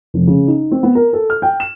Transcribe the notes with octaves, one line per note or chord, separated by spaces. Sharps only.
F1
C#3
D#4
C4
B3
A#4
A4
F6
G5
E7